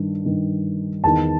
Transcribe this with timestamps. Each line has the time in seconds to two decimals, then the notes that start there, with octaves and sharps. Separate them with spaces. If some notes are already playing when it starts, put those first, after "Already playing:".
Already playing: G2 D#3
0.25 G2 D#3
1.04 E2 D#3 A5